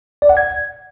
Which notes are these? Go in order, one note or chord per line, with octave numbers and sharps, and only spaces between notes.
D5
F#5
G#6